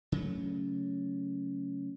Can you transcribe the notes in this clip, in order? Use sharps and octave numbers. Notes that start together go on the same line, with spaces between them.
C#3 F#3 A3